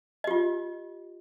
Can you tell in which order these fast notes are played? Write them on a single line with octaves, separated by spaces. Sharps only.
D#5 G4 F4